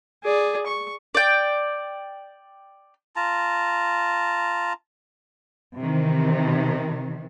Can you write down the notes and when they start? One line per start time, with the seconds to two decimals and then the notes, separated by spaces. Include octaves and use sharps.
0.24 G#4 D5
0.66 C#6
1.15 D5 G5
3.16 F4 A5 A#5
5.78 C3 D#3 E3